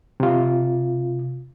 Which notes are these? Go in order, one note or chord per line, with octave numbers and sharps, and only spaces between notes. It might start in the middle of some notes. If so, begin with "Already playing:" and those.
C3 F4